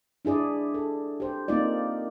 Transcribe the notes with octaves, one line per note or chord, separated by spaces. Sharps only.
D4 E4 G#4 D5
A4
G4 C5
A#3 C4 D#4 F4 D5